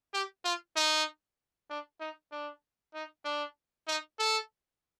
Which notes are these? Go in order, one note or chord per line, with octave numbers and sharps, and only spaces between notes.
G4
F4
D#4
D4
D#4
D4
D#4
D4
D#4
A4